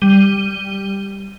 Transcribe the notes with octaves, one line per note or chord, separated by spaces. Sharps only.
G3 D#7 G7